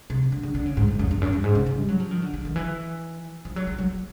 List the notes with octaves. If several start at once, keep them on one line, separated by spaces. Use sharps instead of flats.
C3
D3
D3
D3
C#3
G#2
G#2
F#2
E2
F#2
G2
G#2
C#3
C#3
G3
F#3
F3
D#3
D3
D3
D#3
E3
F3
F#3
F#3
F#3